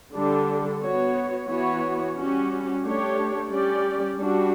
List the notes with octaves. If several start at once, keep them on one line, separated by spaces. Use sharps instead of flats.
D3 G3 D4 A4
B3 F#4 C#5
E3 B3 F#4 C#5
G3 C#4 F#4
A3 D4 G4 C#5
G3 C#4 G4 D5
G3 D4 F#4